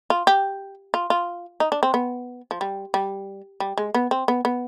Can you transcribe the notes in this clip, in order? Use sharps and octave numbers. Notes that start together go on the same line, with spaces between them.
F4
G4
F4
F4
D#4
D4
C4
B3
F3
G3
G3
G3
G#3
B3
C4
B3
B3